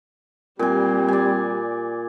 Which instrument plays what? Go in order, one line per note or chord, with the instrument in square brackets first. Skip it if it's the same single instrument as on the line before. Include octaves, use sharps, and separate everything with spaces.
[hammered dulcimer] A#2 G#5 [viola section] G3 [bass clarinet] C4
[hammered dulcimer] D5 G#5